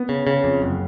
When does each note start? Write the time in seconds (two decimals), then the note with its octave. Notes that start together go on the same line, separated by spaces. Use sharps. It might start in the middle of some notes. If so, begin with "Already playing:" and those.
Already playing: B3
0.09 C#3
0.27 C#3
0.44 F2
0.62 F#1